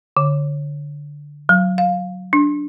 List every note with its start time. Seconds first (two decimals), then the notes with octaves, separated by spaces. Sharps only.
0.17 D3
1.49 F#3
1.78 F5
2.33 D4